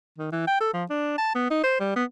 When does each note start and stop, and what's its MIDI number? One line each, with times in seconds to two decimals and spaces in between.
0.19 0.30 51
0.32 0.43 52
0.48 0.56 79
0.61 0.71 69
0.74 0.85 53
0.90 1.14 62
1.18 1.32 81
1.35 1.46 59
1.51 1.60 63
1.64 1.78 72
1.80 1.94 55
1.96 2.04 59